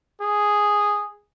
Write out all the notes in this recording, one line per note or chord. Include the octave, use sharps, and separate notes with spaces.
G#4